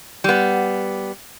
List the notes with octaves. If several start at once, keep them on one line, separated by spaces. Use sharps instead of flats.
G3 B3